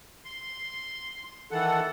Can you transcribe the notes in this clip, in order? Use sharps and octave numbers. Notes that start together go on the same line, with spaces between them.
C6
D#3 E3 A4 F#5